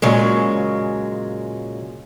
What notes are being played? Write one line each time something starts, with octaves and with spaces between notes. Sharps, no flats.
A#2 C#3 F#3 G#3